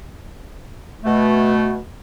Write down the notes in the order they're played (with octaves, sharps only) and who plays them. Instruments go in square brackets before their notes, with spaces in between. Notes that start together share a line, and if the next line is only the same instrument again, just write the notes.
[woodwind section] B2 A3